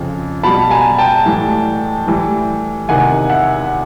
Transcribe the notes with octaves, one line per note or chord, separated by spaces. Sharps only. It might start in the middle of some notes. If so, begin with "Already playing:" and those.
Already playing: F2 C#3 F3
B2 G3 A5 B5
G#5 A#5
G5 A5
A2 E3 G3
A2 E3 G3
E2 C3 D#3 F#5 G#5
E5 F#5